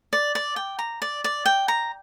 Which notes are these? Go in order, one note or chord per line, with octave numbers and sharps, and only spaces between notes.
D5
D5
G5
A#5
D5
D5
G5
A#5